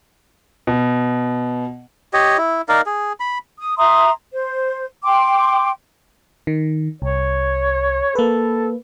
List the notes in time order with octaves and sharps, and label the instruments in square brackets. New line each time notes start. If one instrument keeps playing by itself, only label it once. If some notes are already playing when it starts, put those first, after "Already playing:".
[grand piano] B2
[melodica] G4 C#5 D#5
E4
D#4 A#4 D5 F5
G#4
B5
[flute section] D#6
E5 A#5 C6 D#6
C5
G5 C6 D6
[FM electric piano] D#3
[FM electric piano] C2 [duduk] C#5
[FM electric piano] A#3 B4 [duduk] A4